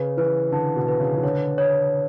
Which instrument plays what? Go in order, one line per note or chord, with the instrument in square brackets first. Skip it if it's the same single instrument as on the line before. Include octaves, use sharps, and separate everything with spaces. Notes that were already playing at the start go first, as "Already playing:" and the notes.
Already playing: [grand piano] C#3 [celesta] B4
[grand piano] E3 [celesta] B4
[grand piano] D3 [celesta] A5
[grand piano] B2
[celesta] B4
[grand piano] C#3
E3
[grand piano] D3 [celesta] C#5
[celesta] C#5